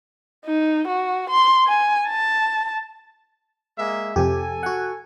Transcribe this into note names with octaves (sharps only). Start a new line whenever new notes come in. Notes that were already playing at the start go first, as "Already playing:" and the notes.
D#4
F#4
C6
G#5
A5
G#3 A#3 E5
F2 C3 G4 A4 G#5
F#4 F#5